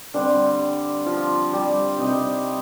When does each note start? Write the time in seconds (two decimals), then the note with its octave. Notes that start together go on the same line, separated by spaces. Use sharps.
0.14 D3 G3 C4 D4
1.06 F3 F4
1.53 G3 G4
1.99 C3 G3 C4 D#4 D#5